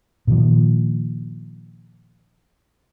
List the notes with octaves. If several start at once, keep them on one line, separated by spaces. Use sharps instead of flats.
A#2 D#3 F3